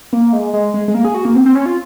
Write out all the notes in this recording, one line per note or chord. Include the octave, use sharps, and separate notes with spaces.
A#3
G#3
G#3
G#3
G#3
A#3
G#4
F#4
A#3
C4
C4
C#4
F4